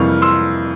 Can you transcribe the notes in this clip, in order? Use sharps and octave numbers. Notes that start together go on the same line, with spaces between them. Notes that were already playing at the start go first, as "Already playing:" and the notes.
Already playing: F2 C3 E3 G3 A#3 C#6 F6
C6 E6